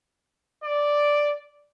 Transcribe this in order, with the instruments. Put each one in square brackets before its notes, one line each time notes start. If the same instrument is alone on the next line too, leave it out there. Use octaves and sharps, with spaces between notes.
[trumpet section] D5